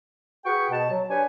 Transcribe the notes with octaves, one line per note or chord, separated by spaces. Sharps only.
F#4 G#4 B4 G5 C#6
B2 A5
F#3
D4 G4 B4 C#5 G#5